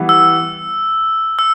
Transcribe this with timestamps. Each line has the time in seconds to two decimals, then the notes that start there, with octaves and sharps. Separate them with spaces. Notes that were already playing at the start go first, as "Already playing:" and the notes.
Already playing: E3 G3 B3
0.09 E6
1.39 E6